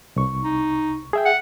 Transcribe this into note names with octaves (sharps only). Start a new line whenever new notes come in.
C2 C#6
D#4
G#4 E5 G5
F#5